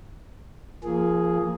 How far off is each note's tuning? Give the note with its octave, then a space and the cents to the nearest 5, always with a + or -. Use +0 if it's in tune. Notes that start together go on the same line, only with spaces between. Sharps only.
F3 -25 A#3 +0 G#4 +0